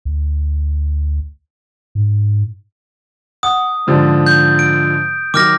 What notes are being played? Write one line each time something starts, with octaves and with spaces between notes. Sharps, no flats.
D2
G#2
F#5 D#6
G#2 D3 F3
G6
D7
D#3 F#3 D6 F6 A#6